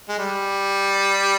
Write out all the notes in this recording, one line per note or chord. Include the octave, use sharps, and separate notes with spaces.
G#3
G3